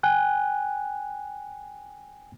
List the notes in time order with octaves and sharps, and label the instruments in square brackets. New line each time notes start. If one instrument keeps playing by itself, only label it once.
[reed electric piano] G5 G#5 F#6